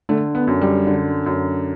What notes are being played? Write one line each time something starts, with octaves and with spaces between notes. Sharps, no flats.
D3 A3
B3
F#2
G3
D3
F#2